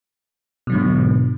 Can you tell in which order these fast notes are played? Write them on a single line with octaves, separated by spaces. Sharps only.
B2 F#3 D3 G#2